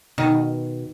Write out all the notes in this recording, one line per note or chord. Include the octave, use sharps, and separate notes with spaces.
B2 D#3